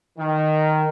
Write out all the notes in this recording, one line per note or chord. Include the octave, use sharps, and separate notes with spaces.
D#3